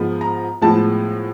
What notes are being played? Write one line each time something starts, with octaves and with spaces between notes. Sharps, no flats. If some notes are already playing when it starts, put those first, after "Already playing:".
Already playing: G#2 F3 G#3 B3
A#5
A2 F3 G#3 B3 A5